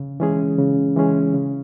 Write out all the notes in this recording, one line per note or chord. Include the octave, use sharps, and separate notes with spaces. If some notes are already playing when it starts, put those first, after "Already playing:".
Already playing: C#3
E3 G#3 C#4 G#4
C#3
E3 G#3 C#4 G#4
C#3